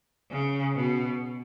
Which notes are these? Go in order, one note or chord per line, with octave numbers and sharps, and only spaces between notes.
C#3
B2